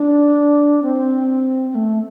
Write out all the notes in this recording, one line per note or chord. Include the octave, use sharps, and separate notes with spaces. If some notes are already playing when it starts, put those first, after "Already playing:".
Already playing: D4
C4
C4
A3